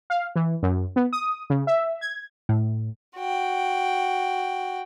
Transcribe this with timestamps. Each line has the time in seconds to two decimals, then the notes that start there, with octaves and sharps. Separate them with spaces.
0.10 F5
0.36 E3
0.63 F#2
0.96 B3
1.13 D#6
1.50 C#3
1.67 E5
2.01 G#6
2.49 A2
3.17 F#4 G5